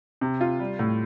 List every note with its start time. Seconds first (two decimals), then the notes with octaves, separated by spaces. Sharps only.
0.21 C3
0.41 F4
0.60 G3
0.79 A2